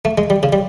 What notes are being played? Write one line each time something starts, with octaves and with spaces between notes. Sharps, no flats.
A3
G#3
G3
C#3
G3